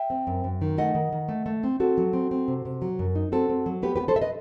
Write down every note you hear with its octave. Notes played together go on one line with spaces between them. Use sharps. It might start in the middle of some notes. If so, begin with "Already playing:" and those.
Already playing: E5 G5
C4
F#2
F#2
D#3
A3 D#5 F#5
D#3
D#3
A3
A3
C4
C4 F#4 A4
F#3
C4
C4
C3
C3
F#3
F#2
D#4
C4 F#4 A4
C4
F#3
B3 G4 B4
G4 B4
B3
A4 C5
E5
B4 D#5